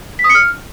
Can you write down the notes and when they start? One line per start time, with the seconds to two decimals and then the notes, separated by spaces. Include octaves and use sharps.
0.19 B6
0.24 D#6
0.29 C#7
0.35 F6